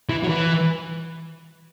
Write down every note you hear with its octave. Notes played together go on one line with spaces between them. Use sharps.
E3
F#3
E3